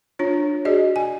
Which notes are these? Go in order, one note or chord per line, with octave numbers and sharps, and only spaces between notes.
D4 F4 C#5
F#4 G#4 D5 D#5
G#5